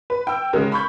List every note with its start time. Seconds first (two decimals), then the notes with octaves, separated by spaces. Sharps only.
0.10 B4
0.27 G5 E6
0.53 C#3 G#3 A#4
0.72 B5 C#6 G6